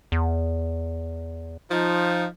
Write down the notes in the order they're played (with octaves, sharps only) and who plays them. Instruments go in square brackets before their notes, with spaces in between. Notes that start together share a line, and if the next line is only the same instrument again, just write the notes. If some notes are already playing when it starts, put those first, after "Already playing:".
[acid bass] E2
[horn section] F3 D#4